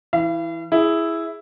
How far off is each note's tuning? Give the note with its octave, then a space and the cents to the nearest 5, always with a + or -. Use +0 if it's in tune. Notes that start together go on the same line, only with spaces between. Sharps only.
E3 +0 F5 -45
E4 +0 G#4 +0